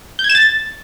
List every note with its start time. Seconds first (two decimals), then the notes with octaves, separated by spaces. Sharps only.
0.19 G6
0.24 G#6
0.30 E7
0.35 A6